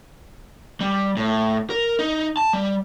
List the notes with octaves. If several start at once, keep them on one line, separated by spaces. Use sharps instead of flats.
G3
A2
A#4
D#4
A5
G3